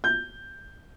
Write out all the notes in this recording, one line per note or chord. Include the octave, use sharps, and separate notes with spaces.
G6